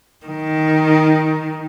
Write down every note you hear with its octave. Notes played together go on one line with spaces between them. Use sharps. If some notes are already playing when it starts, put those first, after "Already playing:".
D#3